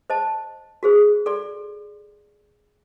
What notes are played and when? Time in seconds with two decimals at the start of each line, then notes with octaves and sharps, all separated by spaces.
0.10 C5 D#5 A5
0.83 F#4 G#4 C5
1.26 A4 D5 C6